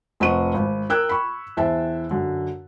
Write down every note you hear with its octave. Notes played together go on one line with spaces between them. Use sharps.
F1 C4 D#5 F#5 C#6 D#7
G#1
A#4 G5 E6 F#6 G#6
B5 C#6
E2 C5 E5 G5 A5
F#2 D3